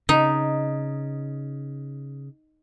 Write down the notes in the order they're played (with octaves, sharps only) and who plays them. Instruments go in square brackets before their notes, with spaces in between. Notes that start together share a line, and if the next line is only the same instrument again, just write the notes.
[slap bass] C#3 [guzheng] D#4